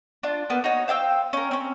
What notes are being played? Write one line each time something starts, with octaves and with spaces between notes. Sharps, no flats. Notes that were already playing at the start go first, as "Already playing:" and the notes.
D4 F4
A#3 B3
D#4 F#4 C#5
C5 F5 G5 E6
C#4 A#4
C4 C#4